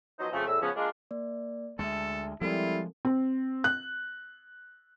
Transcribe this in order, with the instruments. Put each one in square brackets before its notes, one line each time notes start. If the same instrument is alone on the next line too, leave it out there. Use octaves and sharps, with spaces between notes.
[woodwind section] F3 F#3 B3 D#4 C5 D#5
F2 C#3 A3
E2 A2 E6
C#3 F3 B3 C#4
G#3 A#3 D4 F4
[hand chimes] A#3 D5
[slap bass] D2 G#3 [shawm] A4 [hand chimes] E5 A5
[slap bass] F3 G#3 [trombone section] G3 E4 [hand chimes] C4 A4 A#4 [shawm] F4
[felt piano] C4
F#6